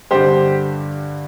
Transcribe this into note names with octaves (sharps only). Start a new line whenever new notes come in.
G2 D3 G4 C5